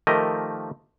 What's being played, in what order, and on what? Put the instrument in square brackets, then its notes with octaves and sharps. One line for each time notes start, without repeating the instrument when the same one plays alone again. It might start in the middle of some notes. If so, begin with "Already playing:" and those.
[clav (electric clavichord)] D#3 F3 A3 G4 A#4 D#5